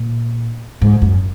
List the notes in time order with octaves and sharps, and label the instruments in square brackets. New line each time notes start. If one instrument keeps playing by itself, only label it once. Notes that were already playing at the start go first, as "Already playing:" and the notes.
Already playing: [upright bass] A#2
G#2
F#2